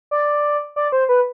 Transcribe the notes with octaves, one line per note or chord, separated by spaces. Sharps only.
D5
D5
C5
B4